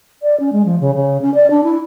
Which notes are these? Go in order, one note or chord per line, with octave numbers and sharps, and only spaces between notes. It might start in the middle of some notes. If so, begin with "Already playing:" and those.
D5
C#4
G#3
F3
C#3
C#3
C#4
D5
D4
E4